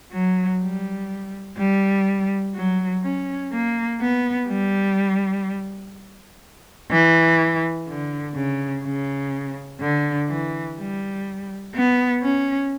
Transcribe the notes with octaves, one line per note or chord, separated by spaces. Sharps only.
F#3
G3
G3
F#3
C#4
A#3
B3
G3
E3
D3
C#3
C#3
D3
E3
G3
B3
C#4